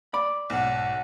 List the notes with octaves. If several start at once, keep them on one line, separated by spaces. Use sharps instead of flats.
D5 B5
B1 G#2 F#5